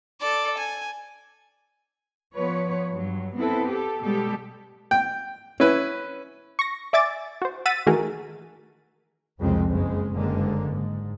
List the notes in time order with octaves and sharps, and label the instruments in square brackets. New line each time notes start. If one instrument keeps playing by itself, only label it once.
[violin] A4 D5
G#5
[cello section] F3 B3 B4 C#5
G2 F#3
B3 C4 E4 A4 B4
G4 A4
B2 G3 G#3 G4 A4
[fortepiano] G5
C#4 E4 B4
[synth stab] C#6 A#6
D5 E5 G#5 D6 A6
F#4 C5
F#5 E6 A6 B6 D#7
D#3 E3 A3 F#4 G#4 A#4
[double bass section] C2 F2 C#3 G#3 C4
F#1 C#3 G#3
F#1 G2 D3 G#3 A#3
G#2